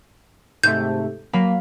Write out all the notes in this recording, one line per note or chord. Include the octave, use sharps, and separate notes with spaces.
G#2 C3 A3 G6
F#3 A#3 F5 B5